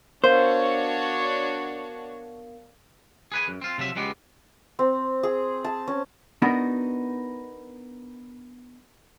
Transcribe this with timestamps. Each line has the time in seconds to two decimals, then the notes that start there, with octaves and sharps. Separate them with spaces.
0.24 B3 D4 F#4 A#4 C5 C#5 F5
3.32 G#4 B4 G#5
3.48 F#2
3.62 C4 F4
3.78 C3 F3 F#3 E5
3.96 C#2 G#3 B3 G4
4.79 C4
5.23 G#4
5.64 A5
5.88 C#4
6.42 B3 D4 D#4 F#4 A#4